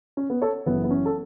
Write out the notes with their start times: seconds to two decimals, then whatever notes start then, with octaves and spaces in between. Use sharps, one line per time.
0.17 C#4
0.30 B3
0.42 A4 C#5
0.66 F#1 F#2 E3 B3
0.84 B3
0.91 C#4
1.06 A4